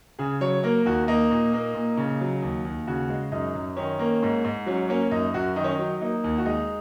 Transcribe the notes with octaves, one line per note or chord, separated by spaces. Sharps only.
C#3 G#4
F#3 C#5
A#3 A#4
D#2 F#4
A#3 D#4
A#2
A#3
A#2
C#3
F#3
D#2
D#2
C#3 F#4
G#3
F#2 D#4
F#2
D#3 C#4
A#3
G#2
G#2
F#3 C#4
A#3 C#4
F#2 D#4
F#2 F#4
D#3 D#4
C#4
D#4
F#3
A#3 D#4
D#2
F#4
G#3 D#4